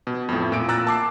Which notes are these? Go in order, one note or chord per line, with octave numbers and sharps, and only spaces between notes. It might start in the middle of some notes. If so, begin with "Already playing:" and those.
B2
F2 A2
A#2 D7
A#2 A#5 E6 F#6 A6
A5 D6 C7